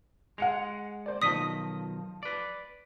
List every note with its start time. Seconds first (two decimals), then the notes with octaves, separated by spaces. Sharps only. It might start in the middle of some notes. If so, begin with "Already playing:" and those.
0.38 G#3 F#5 C#7 F7
1.06 C5 D5
1.22 B1 D#3 F3 D#5 D#6 A#6 B6
2.23 B4 D5